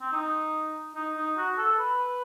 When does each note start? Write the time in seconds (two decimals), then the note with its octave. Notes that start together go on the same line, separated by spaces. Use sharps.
0.01 C4
0.13 D#4
0.95 D#4
1.17 D#4
1.37 F#4
1.58 A4
1.79 B4